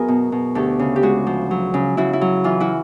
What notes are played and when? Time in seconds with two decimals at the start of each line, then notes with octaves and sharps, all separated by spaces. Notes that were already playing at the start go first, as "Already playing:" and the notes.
Already playing: F#2 B3 F#4 G#4 A#4
0.08 B2
0.32 B2
0.55 D2 G4 A4
0.79 C#3
0.96 G4
1.03 G#3 F#4 G#4
1.27 F3
1.51 F#3
1.74 C#3
1.97 C#3 E4 F#4
2.13 E4
2.21 F#3
2.44 E3 F4
2.60 E4 F#4